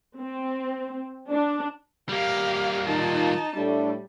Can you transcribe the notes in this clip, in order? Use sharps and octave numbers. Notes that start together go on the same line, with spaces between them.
C4
D4
G3 A#3 G4 F5
D#3 D#4 F4 A5
A2 G3 A3 D4